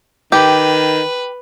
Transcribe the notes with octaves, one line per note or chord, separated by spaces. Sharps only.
D#3 G4 B4